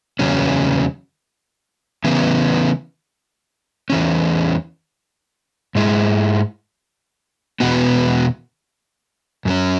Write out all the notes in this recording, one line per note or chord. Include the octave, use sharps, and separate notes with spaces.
E2 C#3 F#3 C#4
C#3 E3 B3
E2 E3 C#4
G#2 G#3 E4
E2 B2 B3 F#4
F#2 F#3 C#4